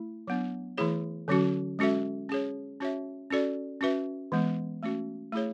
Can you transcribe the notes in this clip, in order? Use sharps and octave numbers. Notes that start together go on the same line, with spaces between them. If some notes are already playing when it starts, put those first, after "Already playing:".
Already playing: A3 E4
F#3 B3 D4
E3 A3 E4 G#4 C#5
D3 F#3 C#4 F#4
G#3 C#4 F#4 A4 E5
C#4 G#4 C#5
C#4 F#4 C#5 E5
C#4 F#4 A4 D5
C#4 F#4 B4 E5
E3 G#3 B3
A3 C#4 F#4
A3 E4 G#4 C#5